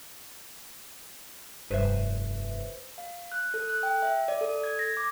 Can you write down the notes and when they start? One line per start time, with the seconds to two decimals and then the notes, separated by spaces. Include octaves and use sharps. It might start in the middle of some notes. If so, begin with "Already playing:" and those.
1.71 F1 G2 B4 C5 E5
2.98 F5
3.32 F#6
3.54 A4
3.70 F#6
3.83 G5
4.02 E5
4.28 D5
4.41 A4
4.64 G#6
4.79 A#6
4.97 D6